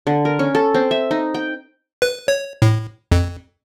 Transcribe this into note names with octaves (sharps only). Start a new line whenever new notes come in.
D3
A#4
C#4
A4
C4
E5
D#4
G5
B4
C#5
A2
F2